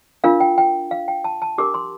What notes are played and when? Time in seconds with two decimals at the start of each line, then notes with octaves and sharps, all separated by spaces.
0.24 D4 F4 A#4 F5
0.40 G5
0.58 G5
0.91 F5
1.08 G5
1.24 A5
1.42 A5
1.58 D4 G4 A#4 D6
1.74 C6